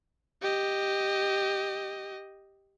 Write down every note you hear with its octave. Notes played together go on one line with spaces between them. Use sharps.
G4 D#5